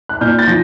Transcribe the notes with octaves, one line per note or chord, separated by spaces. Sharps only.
F#6
A#2 F6 G6
G6 A6
F3 A#6